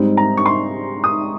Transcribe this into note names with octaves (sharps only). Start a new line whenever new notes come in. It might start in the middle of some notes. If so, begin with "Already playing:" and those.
Already playing: G#2 G3 C4 D#4
A#5
C#6
C6
D#6